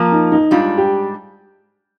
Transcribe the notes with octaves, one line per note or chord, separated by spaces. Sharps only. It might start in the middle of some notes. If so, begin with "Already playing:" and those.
Already playing: F3 A#3 F4 A#4
D#4
D#4
G#2 G3 D4 F4
G4